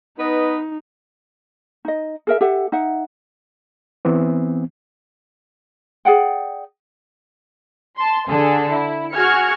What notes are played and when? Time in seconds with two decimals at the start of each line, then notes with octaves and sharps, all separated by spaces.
0.19 B3 D#4 B4 D#5
1.85 D#4 D#5
2.27 G#4 A#4 E5
2.41 G4 A4 E5 F#5
2.72 D#4 E5 F#5
4.05 E3 B3 C4
6.05 G#4 D5 F#5 G5
7.97 A5 C6
8.29 D3 G#4 A4
8.71 E4
9.13 F#4 G#4 F6 G#6 C#7